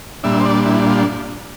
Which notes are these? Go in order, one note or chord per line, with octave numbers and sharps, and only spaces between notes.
A#2 G3 D4 E5
C5
D5
E4
F4